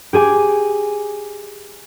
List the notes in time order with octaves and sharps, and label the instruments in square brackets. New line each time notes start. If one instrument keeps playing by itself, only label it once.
[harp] G4 G#4 G#5 D6